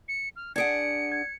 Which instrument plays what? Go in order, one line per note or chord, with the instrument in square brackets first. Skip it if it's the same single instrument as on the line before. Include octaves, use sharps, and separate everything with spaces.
[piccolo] C#7
F6
[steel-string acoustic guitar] D4 G#4 F#5 [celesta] G#6 D7 [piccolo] C#7
[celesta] G#6